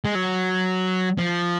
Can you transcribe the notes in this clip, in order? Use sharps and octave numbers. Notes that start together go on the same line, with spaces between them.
G#3
F#3
F3